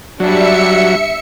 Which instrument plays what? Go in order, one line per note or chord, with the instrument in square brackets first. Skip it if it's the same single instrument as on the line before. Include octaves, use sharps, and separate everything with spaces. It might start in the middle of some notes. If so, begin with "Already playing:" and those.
[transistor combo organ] F#3 [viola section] G3 D4 [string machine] E5 C#7